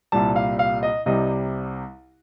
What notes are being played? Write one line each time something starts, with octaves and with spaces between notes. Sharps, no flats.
C2 A#2 G3 A5
F5
F5
D#5
C2 C3 G3 D#5